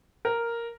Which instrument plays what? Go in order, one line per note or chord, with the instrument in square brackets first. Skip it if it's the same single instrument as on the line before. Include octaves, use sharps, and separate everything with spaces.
[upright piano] A#4